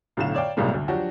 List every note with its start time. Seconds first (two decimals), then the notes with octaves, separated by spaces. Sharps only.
0.17 B1 A2 D3 F5 E7
0.35 C#5 D5 F5 G5
0.57 B1 A2 C3 G3 G#3 A#3
0.74 D2
0.88 F3 F#3 D4 F#4 G4